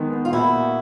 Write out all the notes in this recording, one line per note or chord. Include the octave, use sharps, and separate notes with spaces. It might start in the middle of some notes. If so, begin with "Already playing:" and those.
Already playing: D#3 G#3 B3
B3
F4
A#2 E4 F#4
A#2